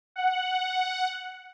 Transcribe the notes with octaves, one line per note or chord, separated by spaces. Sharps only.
F#5